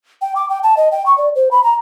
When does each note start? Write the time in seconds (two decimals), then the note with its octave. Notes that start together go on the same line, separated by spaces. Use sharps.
0.22 G5
0.36 D6
0.50 G5
0.63 A5
0.77 D#5
0.92 G5
1.06 C#6
1.18 D5
1.35 C5
1.51 B5
1.64 A#5